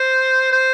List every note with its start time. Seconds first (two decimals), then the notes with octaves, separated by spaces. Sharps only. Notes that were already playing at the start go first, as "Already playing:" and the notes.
Already playing: C5
0.52 C5